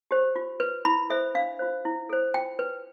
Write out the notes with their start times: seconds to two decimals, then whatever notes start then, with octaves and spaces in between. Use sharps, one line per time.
0.11 G4 C5
0.36 F4
0.60 B4
0.85 E4 B5
1.10 A4 C5 E5
1.35 D4 F5
1.59 F4 C5
1.85 E4
2.09 A4 C5
2.34 F4 G5
2.59 B4